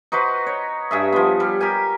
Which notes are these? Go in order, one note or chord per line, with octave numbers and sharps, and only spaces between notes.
D#4 F#4 B4 C5
C#5
G2 G#4 E5
F3 B3
G3
G4 A#4 G#5